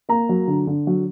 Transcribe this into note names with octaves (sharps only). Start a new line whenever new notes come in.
A#3 A#5
F#3
D3
D3
F#3